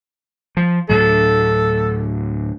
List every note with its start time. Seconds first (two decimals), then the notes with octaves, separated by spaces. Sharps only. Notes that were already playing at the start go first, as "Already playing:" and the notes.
0.57 F3
0.89 D2 A2 F#3 A4